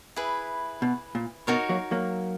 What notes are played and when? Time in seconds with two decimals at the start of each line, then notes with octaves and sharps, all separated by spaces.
0.16 E4 G#4 B4 E5
0.82 B2
1.15 A#2
1.47 B2 D#4 F#4 A#4 C#5
1.69 F#3 A#3
1.91 F#3 A#3